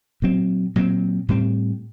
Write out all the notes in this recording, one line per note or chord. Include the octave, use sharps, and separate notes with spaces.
A#2 F#3 C4
A#2 F#3 C4
A2 G3 C4